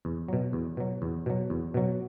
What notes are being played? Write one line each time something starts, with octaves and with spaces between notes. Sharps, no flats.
E2
B2 F#3
E2
B2 F#3
E2
B2 F#3
E2
B2 F#3